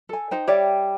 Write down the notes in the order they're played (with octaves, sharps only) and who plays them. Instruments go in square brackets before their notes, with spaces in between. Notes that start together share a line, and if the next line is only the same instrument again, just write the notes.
[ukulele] A4 G#5
D#4 C5 G5
[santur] G3 [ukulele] C#5 D5 E5